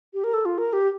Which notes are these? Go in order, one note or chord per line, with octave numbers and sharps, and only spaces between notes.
G4
A#4
A4
F4
A#4
G4